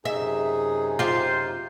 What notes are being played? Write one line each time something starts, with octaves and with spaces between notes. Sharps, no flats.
F#2 C3 D#4 G#4 E5
F4 G4 C5